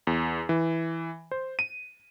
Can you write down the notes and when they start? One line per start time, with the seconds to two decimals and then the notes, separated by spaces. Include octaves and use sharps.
0.07 E2
0.49 E3
1.31 C5
1.59 D#7